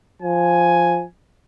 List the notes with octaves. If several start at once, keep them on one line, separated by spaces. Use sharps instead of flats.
F3 G#5